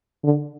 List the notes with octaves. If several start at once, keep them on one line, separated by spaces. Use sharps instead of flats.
D3